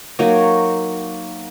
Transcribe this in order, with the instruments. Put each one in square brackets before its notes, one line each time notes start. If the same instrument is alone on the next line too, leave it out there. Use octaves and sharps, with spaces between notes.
[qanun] F#3 A#3 D#4 F#4